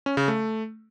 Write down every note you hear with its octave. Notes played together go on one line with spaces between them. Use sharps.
C#4
C#3
A3